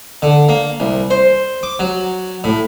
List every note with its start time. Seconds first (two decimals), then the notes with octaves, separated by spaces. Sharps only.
0.22 D3
0.49 A#3
0.80 C2
1.10 C5
1.63 D6
1.79 F#3
2.44 A2